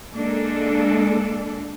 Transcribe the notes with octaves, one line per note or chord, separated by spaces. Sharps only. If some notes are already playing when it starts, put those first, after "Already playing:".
G#3 A#3 D4 A4